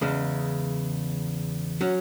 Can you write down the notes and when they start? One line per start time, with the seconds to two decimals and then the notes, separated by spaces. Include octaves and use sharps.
0.01 E2 C#3 G#3
1.81 F#3 C#4